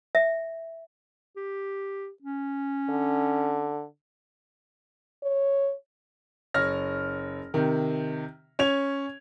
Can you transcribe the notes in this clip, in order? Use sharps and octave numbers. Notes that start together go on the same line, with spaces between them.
E5
G4
C#4
D3
C#5
F#1 C#5 F6 A#6
C3 D#3
C#4 C#5 G#6 F7